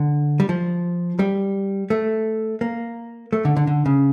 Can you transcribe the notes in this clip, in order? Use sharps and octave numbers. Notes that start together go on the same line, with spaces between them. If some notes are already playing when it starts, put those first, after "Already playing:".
Already playing: D3
G3
F3
G3
A3
A#3
A3
D3
D3
D3
C#3